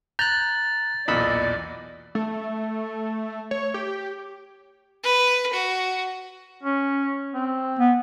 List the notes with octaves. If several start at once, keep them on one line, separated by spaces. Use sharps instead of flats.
A#5 F#6 G6 A6
B1 E2 A#2 D5 D#5 B5 E6
A3
C#5
G4
B4
F#4
C#4
C4
B3